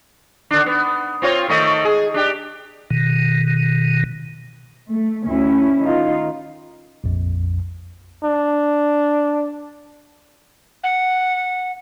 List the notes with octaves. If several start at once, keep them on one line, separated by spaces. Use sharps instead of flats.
D3 D4
B3
C4 F4 C#5
D#3 A3 D#5
G#4
D4 G4
B2 D#3
A3
D2 C#4 E4
D#3 D#4 F4
A#1 F2
D4
F#5